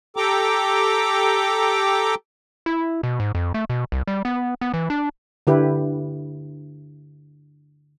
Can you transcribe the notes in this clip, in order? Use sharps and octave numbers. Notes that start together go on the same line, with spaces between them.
G4 A4 G5 A#5 D6
E4
B2
G#2
F2
A3
B2
C2
G3
B3
B3
E3
D4
D3 E4 G4 B4